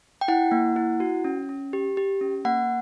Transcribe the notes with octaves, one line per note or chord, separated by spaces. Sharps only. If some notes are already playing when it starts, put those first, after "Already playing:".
G5
E4 F#5
A#3
E4
F#4
C#4
C#4
G4
G4
C#4
A#3 F#5